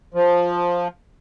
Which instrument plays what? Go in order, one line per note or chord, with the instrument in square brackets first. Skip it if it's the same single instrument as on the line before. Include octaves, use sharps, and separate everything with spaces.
[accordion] F3